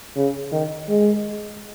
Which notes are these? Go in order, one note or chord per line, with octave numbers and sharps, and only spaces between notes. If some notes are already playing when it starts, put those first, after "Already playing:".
C#3
D#3
G#3